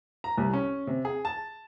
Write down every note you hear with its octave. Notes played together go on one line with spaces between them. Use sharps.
A#5
C2
C#4
C3
G#4
A5